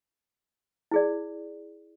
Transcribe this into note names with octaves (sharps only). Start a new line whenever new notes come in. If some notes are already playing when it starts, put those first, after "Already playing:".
E4 G#4 D5